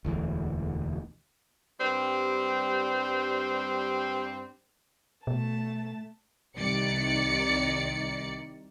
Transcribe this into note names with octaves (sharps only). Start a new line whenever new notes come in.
E1 D2 E3
G2 G3 C4
B2 A3 A5
C2 D#3 D5 C#7